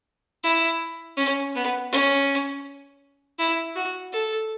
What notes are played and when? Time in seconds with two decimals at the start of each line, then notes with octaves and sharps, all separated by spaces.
0.44 E4
1.17 C#4
1.55 B3
1.92 C#4
3.39 E4
3.76 F#4
4.12 A4